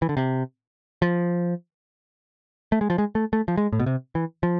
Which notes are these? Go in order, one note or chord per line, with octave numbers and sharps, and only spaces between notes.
E3
D3
C3
F3
A3
G#3
F3
G#3
A3
A3
F3
G#3
A2
B2
C3
E3
F3